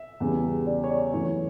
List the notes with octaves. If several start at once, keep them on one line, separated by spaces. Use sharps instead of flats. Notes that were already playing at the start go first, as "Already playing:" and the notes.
Already playing: E5
E2 C#3 G3
D5
C#5
D5
F#2 E3 A3 C#5